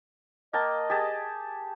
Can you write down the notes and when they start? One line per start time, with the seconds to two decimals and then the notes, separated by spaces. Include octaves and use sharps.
0.53 A#3 D#5 G5 A5
0.90 G4 G#4 A5